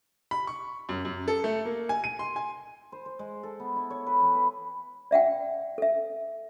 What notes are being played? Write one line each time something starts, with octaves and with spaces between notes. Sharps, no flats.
B5
C#6
F#2
F#2
A4
A3
A#3
G#5
D#7
C6
G#5
C5
C5
G#3
A4
B3
E4
C#5
B4
E3
B4
D5 E5 F#5 G5
A4 E5